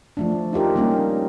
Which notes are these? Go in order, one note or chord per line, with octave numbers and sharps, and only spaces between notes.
F3 A3 D4
D#4 F4 G4 A#4
G3 A#3 C#4 D#4